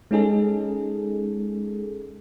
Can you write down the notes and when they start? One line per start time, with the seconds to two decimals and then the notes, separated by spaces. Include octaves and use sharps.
0.11 G#3 C#4 D#4 G#4 A4